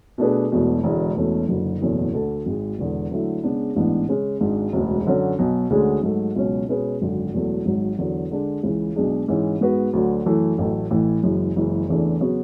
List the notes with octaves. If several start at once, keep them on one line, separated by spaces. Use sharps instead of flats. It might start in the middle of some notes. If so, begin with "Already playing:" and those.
B2 A3 D4 G#4 B4
E1 E2 B2 A3
E1 E2 D3 G#3
E1 E2 B2 A3 C#4
F#1 F#2 D3
F#1 E2 B2 A3 C#4
D2 D3 A3 D4 A4
G#1 G#2 G#3
E1 E2 D3
D3 F#3 A3 E4
C#3 G#3 B3 D4
A1 G#2 E3 B3 D4
C#3 G#3 C#4
G#1 G#2 G#3 D4
E1 D2 C#3 G#3
F#2 D3 F#3 C#4
B1 B2 F#3
D2 D3 G#3 C#4 G#4
G#2 F#3 A3
C#2 B2 F#3 C#4
B2 G#3 C#4 G#4 B4
G#1 F#2 D3
E1 E2 B2 F#3 A3
G#1 G#2 F#3
E2 D3 F#3
D3 G#3 D4
C#2 C#3 E3
B1 B2 G#3 D4 G#4
G#2 E3 G#3 C#4
G#2 G#3 B3 F#4 B4
D2 D3 F#3
F#2 E3 A3
A1 A2 F#3 A3
A1 A2 E3
F#1 F#2 E3 G#3
F#1 F#2 E3 G#3
E2 C#3 E3 A3 D4
C#3 F#3 B3 F#4 C#5